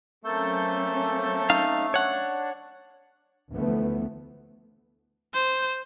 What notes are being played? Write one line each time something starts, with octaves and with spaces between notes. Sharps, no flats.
F#3 A3 A#3 C4 C#4 A4 G6
D#4 F5
D4 C#5 F#5
D2 E3 F3 A3 B3
C5